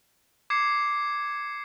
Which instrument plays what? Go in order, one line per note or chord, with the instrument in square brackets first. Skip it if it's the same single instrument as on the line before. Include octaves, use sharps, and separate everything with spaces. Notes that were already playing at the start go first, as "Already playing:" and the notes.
[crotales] D6 G#6 C7 C#7